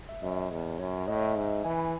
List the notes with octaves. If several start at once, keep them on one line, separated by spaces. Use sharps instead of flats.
E5
F#2 D#5
E2
F#2 C#5
A2 D#5
E5
D#5
G#2 E5
E3 G#5
B5